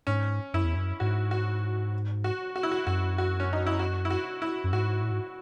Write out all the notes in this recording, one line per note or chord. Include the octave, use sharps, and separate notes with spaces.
G#2 C#4
F#2 E4
E2
F#2
G#2 F#4
F#4
F#4
F#4
E4
F#4
F#2 F#4
F#4
C#4
D#4
E4
F#4
E4
F#4
E4
F#2
G#2 F#4
A2
G#2